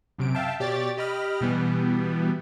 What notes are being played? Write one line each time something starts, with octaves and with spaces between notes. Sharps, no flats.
F#2 C3 D7
E5 F5 G5 A5
B2 G4 C#5 D5 D6 A6
G4 D#5 B5 F6
B2 E3 G3 B3